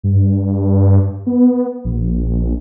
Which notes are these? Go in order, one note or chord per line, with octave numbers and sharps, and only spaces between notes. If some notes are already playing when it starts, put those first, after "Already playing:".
G2
B3
A#1